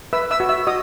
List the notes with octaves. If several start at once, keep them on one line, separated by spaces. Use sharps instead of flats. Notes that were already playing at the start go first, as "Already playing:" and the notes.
B4 E5 E6
E5 E6
F#4
E5 E6
F#4 D#5 D#6